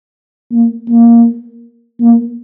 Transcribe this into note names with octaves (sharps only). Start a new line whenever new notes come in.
A#3
A#3
A#3